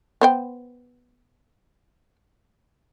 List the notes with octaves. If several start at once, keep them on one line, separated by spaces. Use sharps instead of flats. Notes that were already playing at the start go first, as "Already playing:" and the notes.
B3 C5 G5